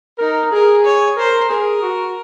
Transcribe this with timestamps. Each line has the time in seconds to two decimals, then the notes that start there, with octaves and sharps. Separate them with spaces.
0.19 D#4 A#4
0.52 G#4 A#4
0.85 C#5
1.17 A#4 C5
1.50 G#4 A#4
1.82 F#4